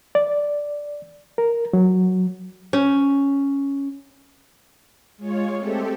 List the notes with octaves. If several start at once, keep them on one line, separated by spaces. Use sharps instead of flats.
D5
A#4
F#3
C#4
G#3 F4 C#5
G#3 A3 C4 G4 A4